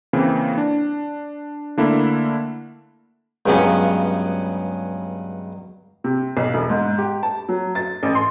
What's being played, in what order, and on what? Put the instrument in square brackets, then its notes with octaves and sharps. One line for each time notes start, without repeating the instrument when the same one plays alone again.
[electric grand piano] C#3 E3 A#3 C4
D4
D3 A3 A#3 D4 E4
[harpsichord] C#2 G2 C#3 F#3 B3 C#4
[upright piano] C3
B1
E1
G#2
G4
A5
F#3
A6
A1
C6